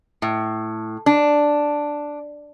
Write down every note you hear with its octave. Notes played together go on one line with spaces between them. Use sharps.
A2
D4